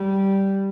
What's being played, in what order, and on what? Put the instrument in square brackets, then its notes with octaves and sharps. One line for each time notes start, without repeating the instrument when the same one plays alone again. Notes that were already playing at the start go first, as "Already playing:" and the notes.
Already playing: [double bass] G3